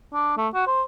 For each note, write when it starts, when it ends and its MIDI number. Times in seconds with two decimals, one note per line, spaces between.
0.14 0.35 62
0.37 0.48 57
0.54 0.65 66
0.67 0.82 72